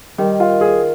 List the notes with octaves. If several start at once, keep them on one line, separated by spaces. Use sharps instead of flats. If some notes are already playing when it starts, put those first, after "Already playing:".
D#3 G3
F4
G#4